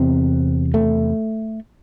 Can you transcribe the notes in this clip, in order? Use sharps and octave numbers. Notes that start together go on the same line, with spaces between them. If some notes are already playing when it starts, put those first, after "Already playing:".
Already playing: E2 C3 C4
A3